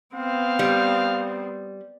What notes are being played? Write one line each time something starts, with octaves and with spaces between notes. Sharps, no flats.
B3 C4 F5
G3